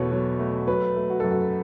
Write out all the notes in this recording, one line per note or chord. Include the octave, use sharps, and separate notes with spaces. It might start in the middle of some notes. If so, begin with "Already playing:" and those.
Already playing: E2 B2 F#3 A3 A4 B4 C#5
F#3
A3
F#3 B4
A3
F#4
F#2 A4
F#4